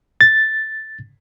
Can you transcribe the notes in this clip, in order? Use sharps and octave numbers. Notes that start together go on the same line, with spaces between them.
A6